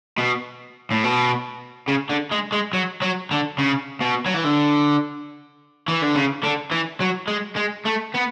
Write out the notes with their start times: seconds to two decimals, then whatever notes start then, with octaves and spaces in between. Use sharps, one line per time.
0.18 B2
0.91 A2
1.04 B2
1.88 C#3
2.09 D3
2.31 G#3
2.52 G#3
2.73 F#3
3.02 F#3
3.31 D3
3.58 C#3
4.01 B2
4.26 F#3
4.34 E3
4.44 D3
5.88 E3
6.02 D3
6.15 C#3
6.43 D3
6.71 E3
7.01 F#3
7.28 G#3
7.56 G#3
7.85 A3
8.14 B3